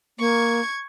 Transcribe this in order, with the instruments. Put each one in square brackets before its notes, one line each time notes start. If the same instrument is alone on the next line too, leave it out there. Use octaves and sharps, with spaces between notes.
[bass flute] A#3 [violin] C#6 G#6